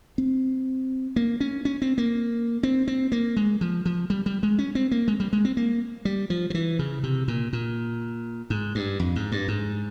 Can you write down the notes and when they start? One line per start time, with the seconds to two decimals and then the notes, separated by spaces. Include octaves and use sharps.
0.18 C4
1.16 A#3
1.40 C#4
1.65 C#4
1.82 C4
1.98 A#3
2.63 C4
2.88 C4
3.12 A#3
3.37 G#3
3.61 F3
3.85 F3
4.10 G3
4.26 G3
4.43 G#3
4.59 C#4
4.75 C4
4.91 A#3
5.08 G#3
5.20 G3
5.33 G#3
5.45 C4
5.57 A#3
6.05 G3
6.30 F3
6.50 F3
6.54 E3
6.79 C#3
7.03 C3
7.28 A#2
7.53 A#2
8.50 G#2
8.75 G2
9.00 F2
9.16 G#2
9.32 G2
9.48 G#2